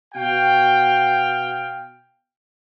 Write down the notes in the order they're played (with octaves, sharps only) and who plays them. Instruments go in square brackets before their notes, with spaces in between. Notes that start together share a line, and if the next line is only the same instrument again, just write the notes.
[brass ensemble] B2 F#4 F5 G5